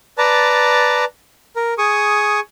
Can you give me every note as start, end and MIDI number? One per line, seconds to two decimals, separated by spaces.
0.18 1.05 71
0.18 1.05 74
0.18 1.05 81
0.18 1.05 82
1.56 1.74 70
1.78 2.40 68
1.78 2.40 85
1.78 2.40 87